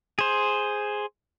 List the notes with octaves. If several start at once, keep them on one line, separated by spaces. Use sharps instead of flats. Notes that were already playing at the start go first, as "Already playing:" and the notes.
G#4 C5